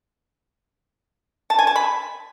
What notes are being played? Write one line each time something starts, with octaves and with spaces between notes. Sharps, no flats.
A5
G#5
A5
B5